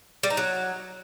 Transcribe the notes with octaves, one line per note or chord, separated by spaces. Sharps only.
G3
D#4
F#3